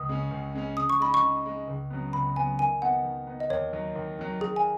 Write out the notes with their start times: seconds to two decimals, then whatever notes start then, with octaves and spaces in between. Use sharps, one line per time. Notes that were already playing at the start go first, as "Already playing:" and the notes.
Already playing: C#2 D#6
0.09 C#3 G#3 C#4
0.31 C#2
0.55 C#3 G#3 C#4
0.77 C#3 D#6
0.90 C#6
1.00 G#3 D#4 B5
1.14 C#6
1.22 C#3
1.46 G#3 D#4
1.67 C#2
1.90 C#3 F#3 B3
2.13 C#2 B5
2.36 C#3 F#3 B3 G#5
2.59 D#3 G#5
2.82 B3 D#4 F#5
3.04 D#3
3.27 B3 D#4
3.40 D#5
3.50 D#2 C#5
3.73 D#3 F#3 D#4
3.96 D#2
4.19 D#3 F#3 D#4
4.41 D#3 G#4
4.56 G#5